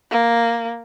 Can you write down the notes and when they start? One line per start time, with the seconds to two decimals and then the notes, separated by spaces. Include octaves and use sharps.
0.11 A#3